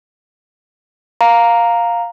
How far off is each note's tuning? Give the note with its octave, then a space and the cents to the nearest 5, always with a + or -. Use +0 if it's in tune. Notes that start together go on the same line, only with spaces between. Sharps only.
F5 +5 A#5 +0